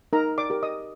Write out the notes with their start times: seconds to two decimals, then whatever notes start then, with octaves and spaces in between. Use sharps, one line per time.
0.13 D#4 A#4 A#5
0.38 D5 D6
0.50 G4 A#4
0.63 D#5 D#6